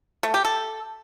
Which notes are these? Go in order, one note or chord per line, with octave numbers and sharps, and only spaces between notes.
A3
G4
A4